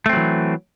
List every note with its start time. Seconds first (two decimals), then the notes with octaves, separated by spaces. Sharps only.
0.06 A3
0.09 C4
0.13 F#3
0.17 E3